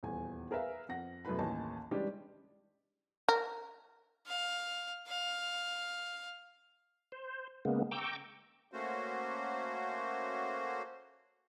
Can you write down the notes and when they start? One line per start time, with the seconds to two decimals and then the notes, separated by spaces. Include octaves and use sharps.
0.03 D#1 E2 G#5
0.51 G#4 A#4 B4 E5 F5
0.89 F2 F#5 A#6
1.25 F#2 B2 A3 E4 B4 B5
1.39 A1 D#2 D#5 G#5 A5
1.91 E3 G3 G#3 C#4 D4 G4
3.29 A#4
4.27 F5
5.07 F5
7.12 C5
7.65 C#3 G#3 A#3 B3
7.91 G5 A#5 C#6 D6 E6 G6
8.72 A3 A#3 C#4 F#4 C5